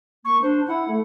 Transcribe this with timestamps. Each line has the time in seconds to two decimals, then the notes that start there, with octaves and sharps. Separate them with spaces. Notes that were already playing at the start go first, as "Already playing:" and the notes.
0.25 A#3 C#6
0.42 D4 C5
0.68 E4 F#5
0.88 A3